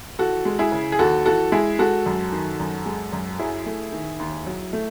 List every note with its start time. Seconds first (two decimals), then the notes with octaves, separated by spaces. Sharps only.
0.19 E3 F#4 A4
0.45 G#3
0.59 E4 G#4
0.72 C#3
0.92 G#4
0.99 D#2 F#4 A4
1.26 E3 F#4 A4
1.52 G#3 E4 G#4
1.79 G#3 F#4 A4
2.06 F#2
2.32 D#3
2.60 F#2
2.86 G#3
3.13 F#2
3.39 F#3 E4 G#4
3.66 A3
3.93 D#3
4.19 D#2
4.46 F#3
4.73 A3